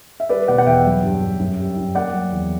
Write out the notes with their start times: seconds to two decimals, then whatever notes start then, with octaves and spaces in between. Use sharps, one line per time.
0.20 E5
0.29 G3 B4 D5
0.48 B2 D5 F#5
0.58 F#5
0.66 E2 E5 G5
0.85 F#3
1.03 G2
1.22 G2
1.40 F#2
1.59 G3
1.77 F#2
1.95 A#3 D5 F#5
2.13 F#3
2.32 E2